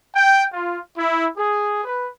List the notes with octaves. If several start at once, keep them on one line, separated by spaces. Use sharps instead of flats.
G5
F4
E4
G#4
B4